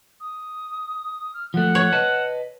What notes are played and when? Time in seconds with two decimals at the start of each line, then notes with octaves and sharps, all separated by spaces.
0.20 D#6
1.34 F6
1.54 F3 A3 F#5
1.75 C#5
1.93 B4 D#5 A5